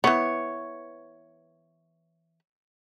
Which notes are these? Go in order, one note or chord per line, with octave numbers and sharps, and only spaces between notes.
E3 B3 C#5